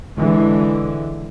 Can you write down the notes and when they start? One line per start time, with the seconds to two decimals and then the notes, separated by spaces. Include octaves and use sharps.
0.17 D3 E3 G#3